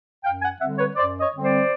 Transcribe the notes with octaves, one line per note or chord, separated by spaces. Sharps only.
F#2 F5 G5
F#5 G#5
D3 G3 C4 E5 F#5
B4 C#5
F#2 C5 D5
C#5 D#5
D3 G3 C4
C5 D5